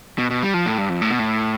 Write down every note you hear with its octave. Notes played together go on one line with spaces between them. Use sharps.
B2
B2
G3
F3
A2
G2
F2
A2
B2
A2